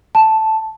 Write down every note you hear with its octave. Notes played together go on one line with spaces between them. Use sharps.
A5